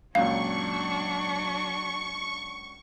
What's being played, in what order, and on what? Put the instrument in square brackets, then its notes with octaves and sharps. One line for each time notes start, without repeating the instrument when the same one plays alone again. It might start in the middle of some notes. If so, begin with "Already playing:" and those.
[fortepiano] C#2 F#2 A#2 [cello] F#3 D4 [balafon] F5 [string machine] C#6